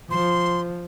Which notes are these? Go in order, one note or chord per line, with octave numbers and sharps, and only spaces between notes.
F3 C6